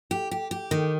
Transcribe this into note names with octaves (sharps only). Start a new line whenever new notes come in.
G4
G4
G4
D#3